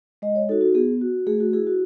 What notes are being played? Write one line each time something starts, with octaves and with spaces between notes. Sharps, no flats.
G#3 D#5
C#5
D#4 F#4 A4
F#4
B3 G#4
F#4
A3 G#4
F#4
E4 G#4
F#4